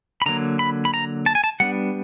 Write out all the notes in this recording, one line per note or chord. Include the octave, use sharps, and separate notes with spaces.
B5
D3 F#3 A#3 A#5
B5
B5
A#5
A5
G#5
A5
G3 B3 D4 F#5